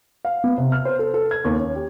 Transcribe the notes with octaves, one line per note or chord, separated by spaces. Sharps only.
F5
B3
C3
F6
C5
A4
A4
G#6
D#2
C#4
G4